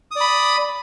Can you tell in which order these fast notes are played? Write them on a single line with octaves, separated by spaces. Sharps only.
D#6 D5 B5